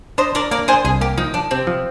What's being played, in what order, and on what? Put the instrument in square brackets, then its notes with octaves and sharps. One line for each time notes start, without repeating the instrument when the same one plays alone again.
[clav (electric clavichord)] D4 [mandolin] C5 D#5
[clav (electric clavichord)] D4 [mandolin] A#4 D5
[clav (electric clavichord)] A#3 [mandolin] A#4 D5
[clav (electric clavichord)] D4 [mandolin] G#4 C5
[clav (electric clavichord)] C2 [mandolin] G#4
[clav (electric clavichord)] A#3 [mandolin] G4
[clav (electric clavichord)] F3 [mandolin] D#4
[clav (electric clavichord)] F3 [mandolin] D4
[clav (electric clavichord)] C3 [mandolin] C4
[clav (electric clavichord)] F3